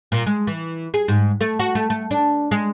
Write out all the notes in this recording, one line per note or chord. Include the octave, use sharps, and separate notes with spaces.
A#2
G#3
E3
G#4
G#2
A3
F#4
A3
A3
D4
G#3